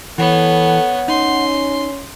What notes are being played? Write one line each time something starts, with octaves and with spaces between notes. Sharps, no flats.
E3 B3 A4 C#5 F#5
C#4 D#4 C6